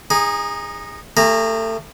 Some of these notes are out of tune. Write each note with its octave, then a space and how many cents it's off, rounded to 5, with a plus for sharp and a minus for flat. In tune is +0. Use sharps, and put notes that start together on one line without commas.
D#4 +0 G#4 -25
A3 +30 G#4 -40 A#5 -10